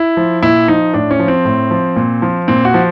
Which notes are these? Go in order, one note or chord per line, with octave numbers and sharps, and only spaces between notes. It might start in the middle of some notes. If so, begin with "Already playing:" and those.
Already playing: E4
F3
A#2 E4
F3 D#4
A2 D4
C#4
F3
C4
A2
F3
A#2
F3
A#2 C4
F#4
F3